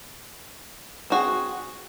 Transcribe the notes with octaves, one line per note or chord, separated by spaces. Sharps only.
C4 F#4 G#4